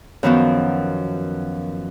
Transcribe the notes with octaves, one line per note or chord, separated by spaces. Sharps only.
F#2 D#3 F3 B3 F#4